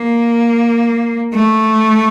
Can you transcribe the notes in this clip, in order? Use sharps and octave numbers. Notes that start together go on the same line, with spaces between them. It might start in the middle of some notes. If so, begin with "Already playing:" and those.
Already playing: A#3
A3